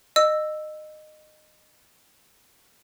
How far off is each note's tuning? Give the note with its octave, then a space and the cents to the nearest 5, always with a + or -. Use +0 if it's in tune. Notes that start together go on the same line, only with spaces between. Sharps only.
D#5 -20 E6 +0